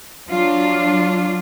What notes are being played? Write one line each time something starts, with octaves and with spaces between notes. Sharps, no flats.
F#3 D4 F4